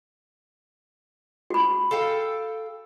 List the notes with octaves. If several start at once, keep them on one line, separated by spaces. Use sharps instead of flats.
F#4 B5
A4 F5 G5